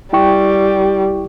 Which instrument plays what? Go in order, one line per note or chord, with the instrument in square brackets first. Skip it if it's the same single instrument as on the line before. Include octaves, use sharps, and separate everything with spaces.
[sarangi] G3 [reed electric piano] E4 G5 C#6